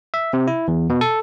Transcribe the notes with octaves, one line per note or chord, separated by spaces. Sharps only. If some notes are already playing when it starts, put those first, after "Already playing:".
E5
C3
E4
E2
B2
A4